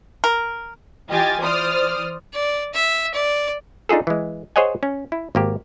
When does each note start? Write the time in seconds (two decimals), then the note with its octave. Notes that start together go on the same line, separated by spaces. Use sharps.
0.24 A#4
1.08 E3 F4 G4 D#5 G#5 A6
1.40 E3 C5 D5 D#6 F6
2.34 D5
2.74 E5
3.14 D5
3.89 D4 D#4 F4 G#4 A4
4.07 E3 G#3
4.56 G#4 C5 C#5 D#5 F#5 G#5
4.83 C#4
5.12 E4
5.35 G#1 A#3 G4